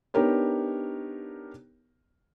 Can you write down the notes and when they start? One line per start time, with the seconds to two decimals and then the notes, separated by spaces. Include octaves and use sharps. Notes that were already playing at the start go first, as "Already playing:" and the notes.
0.14 B3 D4 D#4 G4 A#4 C#5